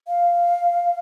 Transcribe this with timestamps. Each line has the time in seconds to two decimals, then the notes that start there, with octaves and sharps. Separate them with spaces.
0.08 F5